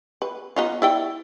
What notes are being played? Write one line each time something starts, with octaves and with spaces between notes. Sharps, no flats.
B4
B3 D#4 F4
E4 D5 G5